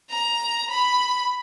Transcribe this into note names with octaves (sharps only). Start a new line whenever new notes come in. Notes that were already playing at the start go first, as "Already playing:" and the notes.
A#5
B5